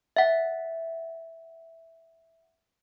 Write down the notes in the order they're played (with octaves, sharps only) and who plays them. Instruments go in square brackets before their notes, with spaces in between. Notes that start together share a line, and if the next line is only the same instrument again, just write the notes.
[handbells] E5 F#5